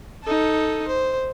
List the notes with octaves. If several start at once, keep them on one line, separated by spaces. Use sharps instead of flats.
D#4 A4
C5